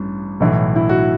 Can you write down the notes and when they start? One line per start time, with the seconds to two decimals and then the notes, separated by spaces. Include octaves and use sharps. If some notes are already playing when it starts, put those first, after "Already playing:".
Already playing: A1 G2
0.40 B1 A2 E3
0.76 E4
0.89 F#4